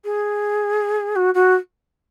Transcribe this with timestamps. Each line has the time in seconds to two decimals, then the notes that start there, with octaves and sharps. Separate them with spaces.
0.05 G#4
1.16 F#4
1.34 F#4